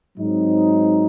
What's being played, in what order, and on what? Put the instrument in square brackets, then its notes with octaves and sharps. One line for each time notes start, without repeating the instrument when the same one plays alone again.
[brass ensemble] G#2 F#3 C4 D#4